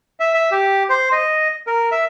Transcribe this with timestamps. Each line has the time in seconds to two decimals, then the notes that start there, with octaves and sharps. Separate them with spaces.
0.20 E5
0.34 E5
0.51 G4
0.90 C5
1.12 D#5
1.67 A#4
1.92 E5